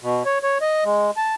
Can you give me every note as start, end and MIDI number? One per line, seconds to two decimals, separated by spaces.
0.01 0.23 47
0.25 0.38 73
0.43 0.58 73
0.61 0.84 75
0.85 1.11 56
1.17 1.35 81